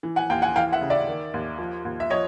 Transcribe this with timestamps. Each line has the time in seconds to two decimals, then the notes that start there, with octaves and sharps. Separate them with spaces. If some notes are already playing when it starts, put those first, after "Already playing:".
0.03 E3
0.16 F#5 G#5
0.30 D#2 F5 G5
0.42 F#5 G#5
0.56 E3 F5 G5
0.73 E5 F#5
0.81 C#3
0.90 D5 E5
1.08 D#3
1.34 D#2
1.59 F3
1.85 D#2
2.00 E5
2.10 F3 C#5 D#5